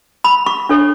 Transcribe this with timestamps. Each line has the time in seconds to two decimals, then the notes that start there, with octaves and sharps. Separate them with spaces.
0.24 B5
0.46 C#6
0.69 D4 A4 C#5